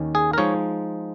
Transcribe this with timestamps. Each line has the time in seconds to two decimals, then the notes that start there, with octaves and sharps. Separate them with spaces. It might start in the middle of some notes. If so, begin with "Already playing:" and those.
Already playing: D#2 D#3 C#4
0.15 G#4
0.33 A#4
0.38 F3 G#3 D#4 C#5